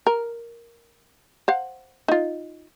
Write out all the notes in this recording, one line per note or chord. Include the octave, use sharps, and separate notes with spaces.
A#4
C5 F5 F#5
D#4 F4